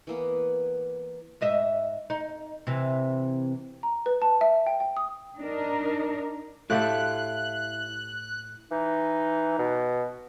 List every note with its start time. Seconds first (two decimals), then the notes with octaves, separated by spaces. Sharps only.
0.07 E3 A#3 B3
1.41 G#2 D#5 E5
2.10 D#4
2.67 C3 E3
3.83 A#5
4.06 B4
4.22 A5
4.41 E5
4.67 G5
4.80 G5
4.97 D#6
5.38 D4 D#4 A#4
6.70 A2 E4 G4 A4 E5 F5 F#6
8.71 E3 D#4
9.59 B2